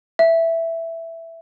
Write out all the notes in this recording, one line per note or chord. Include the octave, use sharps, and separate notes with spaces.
E5